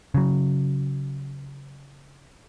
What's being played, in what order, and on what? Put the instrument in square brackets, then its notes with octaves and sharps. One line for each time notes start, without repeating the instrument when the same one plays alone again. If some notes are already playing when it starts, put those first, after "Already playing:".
[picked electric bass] C#3 F#3